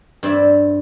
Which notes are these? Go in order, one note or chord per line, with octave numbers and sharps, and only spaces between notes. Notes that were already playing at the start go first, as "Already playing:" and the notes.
G2 C4 D5 E5